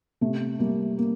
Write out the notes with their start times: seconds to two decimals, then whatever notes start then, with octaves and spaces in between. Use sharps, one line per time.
0.21 C3 A3
0.59 G3 A#3
0.98 A#3